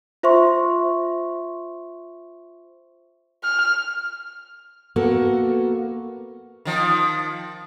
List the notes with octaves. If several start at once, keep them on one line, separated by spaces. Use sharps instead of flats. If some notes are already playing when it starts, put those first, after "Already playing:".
F4 C5 E5 C6 C#6
F6
A#3 B3 F#4 A4 A#4
D#3 F3